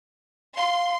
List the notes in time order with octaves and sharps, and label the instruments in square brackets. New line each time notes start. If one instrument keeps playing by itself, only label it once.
[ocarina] F5 [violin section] C6